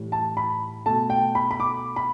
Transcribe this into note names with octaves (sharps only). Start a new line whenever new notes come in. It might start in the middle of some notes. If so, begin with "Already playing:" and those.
Already playing: A2 E3 G3
A5
B5
B2 A3 A5
G5
B5
B5
D6
B5